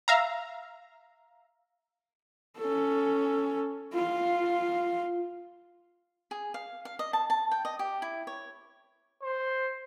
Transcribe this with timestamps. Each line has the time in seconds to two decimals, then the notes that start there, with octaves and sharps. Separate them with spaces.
0.08 E5 F5 A#5
2.58 C#4 A4
3.94 F4
6.31 G#4
6.54 F5
6.85 F5
6.99 D#5
7.13 A5
7.30 A5
7.51 G5
7.65 D#5
7.79 G4
8.02 E4
8.27 C#5
9.22 C5